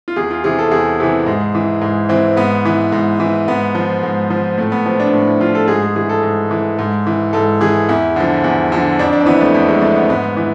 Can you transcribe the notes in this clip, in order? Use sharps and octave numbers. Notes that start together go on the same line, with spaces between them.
F4
E2 G#4
F4
C3 E3 G#4
A4
E2 G#4
C3 E3
G#2
E3
G#2
E3 C4
G#2 B3
E3
G#2
E3
G#2 B3
F3
G#2
F3
A2 A3
B3
F3 C4
D4
A2
E4
F3 F4
A4
G#2 G#4
G#4
E3 G#4
A4
G#2
E3
G#2
E3
G#2 A4
E3 G#4
E2 E4
D3 F3
E2
D3 F3
F2 D4
D4
C4
E3 B3
A3
F2 A3
G#3
E3 A3
B3
G#2 B3
E3